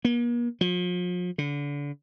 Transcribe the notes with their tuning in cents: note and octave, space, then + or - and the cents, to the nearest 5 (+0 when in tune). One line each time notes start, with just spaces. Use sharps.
A#3 +45
F3 +40
D3 -30